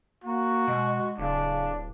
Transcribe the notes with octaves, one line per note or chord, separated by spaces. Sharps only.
A#3 F#4
B2 G#3
D1 C#3 D4